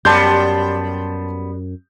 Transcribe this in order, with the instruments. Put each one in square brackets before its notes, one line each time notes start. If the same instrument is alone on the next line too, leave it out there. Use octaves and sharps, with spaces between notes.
[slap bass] F#2 [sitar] G3 B3 [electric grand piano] A5 C6 G6